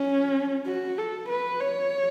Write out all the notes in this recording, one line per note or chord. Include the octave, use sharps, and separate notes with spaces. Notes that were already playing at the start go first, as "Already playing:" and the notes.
Already playing: C#4
F#4
A4
B4
C#5